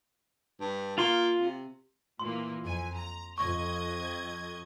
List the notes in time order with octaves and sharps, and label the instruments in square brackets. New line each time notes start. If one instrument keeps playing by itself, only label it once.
[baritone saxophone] G2
[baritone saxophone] A#3 [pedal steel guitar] F4 C6
[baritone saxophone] C3
[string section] A#2 E3 A#3 [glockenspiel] C6
[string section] F2 G#5
A#5
[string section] F2 D#5 G#6 [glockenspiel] C#6